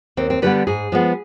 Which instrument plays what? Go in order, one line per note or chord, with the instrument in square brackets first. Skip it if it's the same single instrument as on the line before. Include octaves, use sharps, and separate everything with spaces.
[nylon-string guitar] D#2 C4
C4
D3 G3 B3 B4
G#2 G#4
F3 G#3 B3